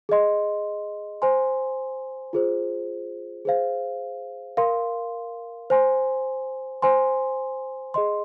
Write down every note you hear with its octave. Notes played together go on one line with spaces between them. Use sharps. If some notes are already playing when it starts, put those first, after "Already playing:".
G#4 D#5 C6
C5 G#5 C6
F4 G#4 C5
G#4 C5 F5
A#4 F5 C6
C5 G#5 C6
C5 G#5 C6
G#4 D#5 C6